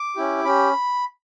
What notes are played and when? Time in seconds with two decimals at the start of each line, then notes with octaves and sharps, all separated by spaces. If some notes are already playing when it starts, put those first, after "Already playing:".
Already playing: D6
0.16 C#4 E4 G4
0.44 C#4 G4 B5